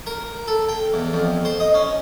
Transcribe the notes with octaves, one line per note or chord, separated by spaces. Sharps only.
A#4
A4
G5
E2
F2
C5
D#5
C#4